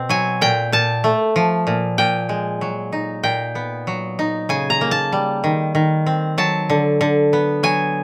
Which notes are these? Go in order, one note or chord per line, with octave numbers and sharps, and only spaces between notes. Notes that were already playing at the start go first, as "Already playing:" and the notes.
Already playing: B2 C4
F#3 G#5
A#2 G5
A#2 A5
A3
F3
A#2
A#2 G5
G#3
F#3
D#4
A#2 G5
B3
F#3
D#4
C#3 G#5
A#5
A#3
A5
G3
D#3
D#3
C4
F#3 A5
D3
D3
B3
F#3 G#5